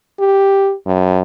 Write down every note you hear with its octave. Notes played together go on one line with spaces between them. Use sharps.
G4
F#2